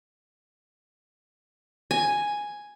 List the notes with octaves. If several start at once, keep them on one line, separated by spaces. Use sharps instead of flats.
G#5